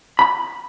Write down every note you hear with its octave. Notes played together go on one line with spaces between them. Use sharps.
B5